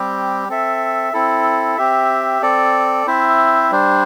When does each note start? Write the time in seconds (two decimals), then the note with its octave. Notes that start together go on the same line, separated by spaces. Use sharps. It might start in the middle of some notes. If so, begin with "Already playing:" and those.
Already playing: G3 C4 G4
0.49 C4 A4 E5
1.13 C4 E4 A4
1.77 C4 G4 E5
2.42 C4 A4 D5
3.07 C4 E4 C5 E5
3.71 G3 D4 C5